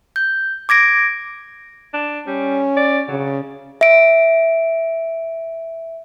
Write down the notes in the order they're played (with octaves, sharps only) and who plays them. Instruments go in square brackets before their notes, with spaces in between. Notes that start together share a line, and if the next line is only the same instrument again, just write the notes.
[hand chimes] G6
D6 G#6 A#6 D7
[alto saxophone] D4
[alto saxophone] G3 [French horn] C#4
[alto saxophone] D5
[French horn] C#3 [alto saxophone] F#3
[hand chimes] E5 D7